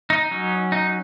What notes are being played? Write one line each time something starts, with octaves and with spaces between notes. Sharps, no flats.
D#4
F#3 C#4
D#4